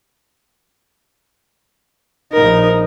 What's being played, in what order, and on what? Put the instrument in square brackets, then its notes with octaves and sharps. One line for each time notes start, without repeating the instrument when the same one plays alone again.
[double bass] A#1 D#4 [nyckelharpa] A#4